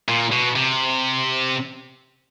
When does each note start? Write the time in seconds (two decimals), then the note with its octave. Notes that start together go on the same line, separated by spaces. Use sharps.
0.08 A#2
0.32 B2
0.56 C3